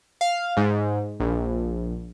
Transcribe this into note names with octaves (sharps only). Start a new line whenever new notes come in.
F5
G#2
A#1